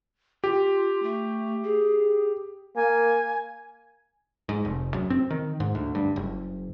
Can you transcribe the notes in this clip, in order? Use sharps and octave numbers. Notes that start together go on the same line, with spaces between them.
F4 G4
A3
G#4
A#3 G#5
G#2
F1
F#2
C4
D#3
G#2
D2
G2
F#1